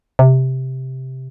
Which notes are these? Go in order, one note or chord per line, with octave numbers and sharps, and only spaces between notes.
C3